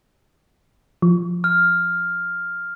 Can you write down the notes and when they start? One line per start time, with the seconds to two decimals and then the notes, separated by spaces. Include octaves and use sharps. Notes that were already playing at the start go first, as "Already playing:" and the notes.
1.02 F3
1.44 F6